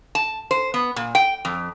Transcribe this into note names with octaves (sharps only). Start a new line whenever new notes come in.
A5
C5
B3
A#2
G5
F2